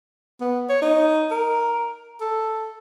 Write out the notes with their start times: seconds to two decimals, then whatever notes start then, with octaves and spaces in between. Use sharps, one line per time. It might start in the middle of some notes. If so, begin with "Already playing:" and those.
0.41 B3
0.69 C#5
0.82 D#4
1.31 A#4
2.21 A4